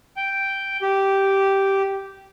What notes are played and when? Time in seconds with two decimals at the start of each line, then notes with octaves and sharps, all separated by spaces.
0.17 G5
0.82 G4